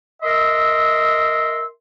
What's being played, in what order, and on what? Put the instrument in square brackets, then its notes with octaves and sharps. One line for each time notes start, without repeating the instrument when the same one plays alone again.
[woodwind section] A#4 D#5 E5 C6 E6